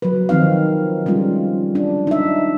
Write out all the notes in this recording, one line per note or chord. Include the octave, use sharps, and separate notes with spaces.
F#3 B4
D#3 F3 C4 D#4 F5
G3 G#3 C#4 F4
D4
D#4 E5